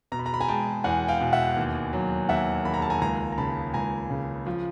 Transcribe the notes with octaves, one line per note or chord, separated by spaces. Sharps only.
B2 A#5
B5
A#5
B5
G#5 A#5
G#3 G5 A5
E2 F#5 G#5
F5 G5
B2
E5 F#5
D#2
F#3
D#2 E5 F#5
D#2 B5
A#5
A5
G#5 A#5
C#2 G#5 A#5
A#5
C#3 A5 B5
C#2 G#5 A#5
C#3
F3